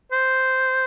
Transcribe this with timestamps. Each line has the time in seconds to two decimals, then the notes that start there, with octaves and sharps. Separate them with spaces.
0.12 C5